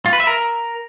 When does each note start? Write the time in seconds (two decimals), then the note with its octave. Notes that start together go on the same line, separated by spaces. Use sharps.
0.06 F4
0.13 B4
0.20 E5
0.27 A#4